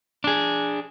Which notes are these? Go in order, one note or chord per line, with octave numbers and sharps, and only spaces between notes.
D4 G#4